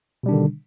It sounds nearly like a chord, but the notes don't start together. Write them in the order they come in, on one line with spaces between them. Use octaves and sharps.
B2 G3 D4 D#3 D3